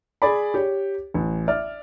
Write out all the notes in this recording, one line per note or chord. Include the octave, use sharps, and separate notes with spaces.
G#4 D5 B5
G4 C#5
A1
D5 E5 F6